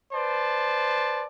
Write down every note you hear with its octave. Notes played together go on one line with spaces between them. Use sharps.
B4 C5 D5 A5